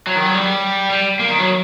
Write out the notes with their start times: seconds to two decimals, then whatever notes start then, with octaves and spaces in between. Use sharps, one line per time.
0.07 F#3
0.15 D#3
0.25 F#3
0.34 G3
0.90 G3
1.19 A#3
1.29 D#3
1.39 F#3